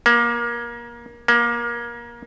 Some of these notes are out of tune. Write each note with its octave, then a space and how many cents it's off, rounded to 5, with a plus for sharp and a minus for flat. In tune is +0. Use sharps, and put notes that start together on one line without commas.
A#3 +25
A#3 +25